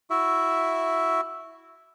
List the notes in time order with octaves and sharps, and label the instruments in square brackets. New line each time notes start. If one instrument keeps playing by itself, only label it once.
[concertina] E4 F#4 E5